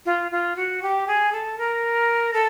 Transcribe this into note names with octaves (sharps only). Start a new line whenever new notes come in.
F4
F4
F#4
G4
G#4
A4
A#4
A4